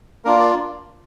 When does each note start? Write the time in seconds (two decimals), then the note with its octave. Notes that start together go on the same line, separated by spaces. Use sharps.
0.25 A#3 D4 F4 A#4
0.40 D5